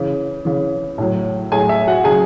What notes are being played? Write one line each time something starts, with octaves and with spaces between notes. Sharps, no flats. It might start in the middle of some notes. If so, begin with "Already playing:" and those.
Already playing: C#3 E3
C#3 E3
A2 F#3
A2 F#3 G#4 G#5
E5
F#4 F#5
C#3 F#3 G#4 G#5